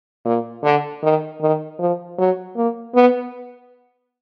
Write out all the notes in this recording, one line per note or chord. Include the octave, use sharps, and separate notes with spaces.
A#2
D3
D#3
D#3
F3
F#3
A#3
B3